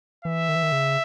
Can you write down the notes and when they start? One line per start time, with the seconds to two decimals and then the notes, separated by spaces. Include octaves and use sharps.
0.25 E3 E5
0.49 D#3
0.56 E3
0.63 D#3
0.72 C#3